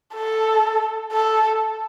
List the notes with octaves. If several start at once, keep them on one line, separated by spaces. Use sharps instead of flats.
A4
A4